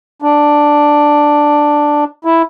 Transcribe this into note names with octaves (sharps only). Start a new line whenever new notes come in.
D4
E4